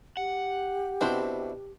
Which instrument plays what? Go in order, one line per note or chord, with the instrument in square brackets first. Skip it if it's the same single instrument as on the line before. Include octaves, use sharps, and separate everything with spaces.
[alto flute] G4 [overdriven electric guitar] F#5
[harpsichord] B2 D4 [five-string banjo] C4 E4 C5